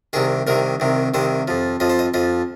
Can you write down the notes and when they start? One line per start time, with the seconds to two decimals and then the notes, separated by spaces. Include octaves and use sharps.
0.13 C2 C3 D#3 G#4
0.47 C2 C3 D#3 A#4
0.80 C2 C3 D#3
1.14 C2 C3 D#3 C5
1.48 F2 F3
1.80 F2 F3 D#5
1.90 C5
1.99 D#5
2.14 F2 F3 D#5